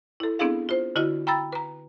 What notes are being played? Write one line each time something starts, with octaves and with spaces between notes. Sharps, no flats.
E4 A4
B3 C4 D4 E4 G#4 F5
F4 C5
D3 E4 F#4 D#5 F6
G5 A#5 B5 E6 A6
B4 A#5